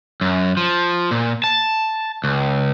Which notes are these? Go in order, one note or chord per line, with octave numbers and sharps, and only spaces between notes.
F#2
F3
A#2
A5
C#2